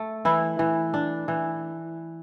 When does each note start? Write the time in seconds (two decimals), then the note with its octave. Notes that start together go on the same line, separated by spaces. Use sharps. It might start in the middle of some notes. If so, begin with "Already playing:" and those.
Already playing: A3
0.25 E3 E4
0.59 E3
0.94 D4
1.28 E3